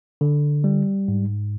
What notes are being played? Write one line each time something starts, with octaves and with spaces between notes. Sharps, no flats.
D3
G3
G#2